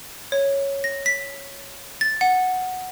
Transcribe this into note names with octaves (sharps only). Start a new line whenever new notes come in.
C#5
A#6
B6
A6
F#5